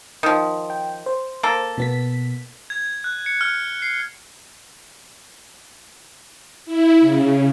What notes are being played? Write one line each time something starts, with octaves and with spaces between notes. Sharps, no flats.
D#3 F3
G5
C5
A#3 A4
B2 B3 B6
G#6
F#6
C#7
F6
C7
E4
C#3